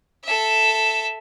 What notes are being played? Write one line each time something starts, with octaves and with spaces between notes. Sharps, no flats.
A4 E5